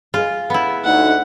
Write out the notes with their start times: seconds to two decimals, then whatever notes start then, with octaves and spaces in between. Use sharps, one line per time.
0.14 F4 G#4 D#5
0.50 B3 E4
0.84 D2 D#4 F#5